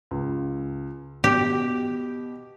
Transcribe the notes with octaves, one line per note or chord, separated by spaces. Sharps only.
C#2
B2 G4